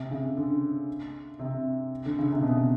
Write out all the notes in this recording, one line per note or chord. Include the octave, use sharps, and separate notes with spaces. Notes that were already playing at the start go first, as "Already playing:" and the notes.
Already playing: C3
C#3
D3
C3
D3
C#3
C3
B2